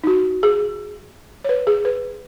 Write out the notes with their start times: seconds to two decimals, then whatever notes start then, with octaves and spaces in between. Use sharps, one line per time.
0.04 D#4
0.07 F#4
0.43 G#4
1.45 C#5
1.49 B4
1.67 G#4
1.85 B4